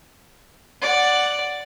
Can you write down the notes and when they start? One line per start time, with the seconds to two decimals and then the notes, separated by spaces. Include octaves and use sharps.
0.82 D5 F#5